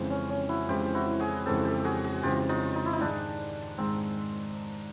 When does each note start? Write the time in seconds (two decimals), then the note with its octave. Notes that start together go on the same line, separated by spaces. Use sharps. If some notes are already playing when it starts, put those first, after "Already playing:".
Already playing: F2 C#3 E3 G#3 C4
0.10 C#4
0.29 C#4
0.49 E4 F#4
0.68 F2 C#3 E3 G#3 C4 F4 G4
0.94 E4 F#4
1.19 F#4 G#4
1.45 F2 C#3 E3 G#3 C4 G4 A4
1.65 G4 A4
1.84 F#4 G#4
2.04 F#4 G#4
2.23 F2 C#3 E3 G#3 C4 F4 G4
2.49 D#4 F4
2.75 D#4
2.86 E4
2.93 D#4
3.00 G#2 D#3 G#3 D4
3.78 G#2 D#3 G#3 C4